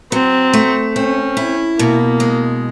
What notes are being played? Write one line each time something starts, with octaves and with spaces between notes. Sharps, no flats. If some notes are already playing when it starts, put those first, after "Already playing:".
F#3 C4
A3
C4 C#4
E4
B2 A#3
G#3